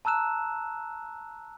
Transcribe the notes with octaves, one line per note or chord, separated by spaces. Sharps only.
A5 A#5 E6 F#6 E7